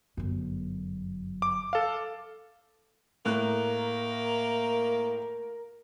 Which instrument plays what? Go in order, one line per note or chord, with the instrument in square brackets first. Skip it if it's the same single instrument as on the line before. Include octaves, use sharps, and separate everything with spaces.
[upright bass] G1 F#2
[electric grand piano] D6
A4 F5
[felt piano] A2 F#6 [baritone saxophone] A#3 [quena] A#4